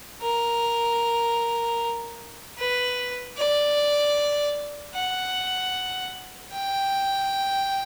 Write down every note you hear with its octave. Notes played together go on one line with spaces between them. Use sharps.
A#4
B4
D5
F#5
G5